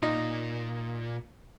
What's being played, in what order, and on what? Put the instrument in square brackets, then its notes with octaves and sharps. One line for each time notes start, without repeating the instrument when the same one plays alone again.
[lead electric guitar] A#2 [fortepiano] D#4